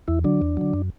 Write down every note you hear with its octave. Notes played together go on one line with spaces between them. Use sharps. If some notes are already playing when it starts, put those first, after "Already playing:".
E2 E4
D3 F#3 D4
E2
D3 F#3
F#2